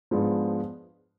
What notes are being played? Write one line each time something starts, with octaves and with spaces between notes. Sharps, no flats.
G#2 F3 G#3 B3 D4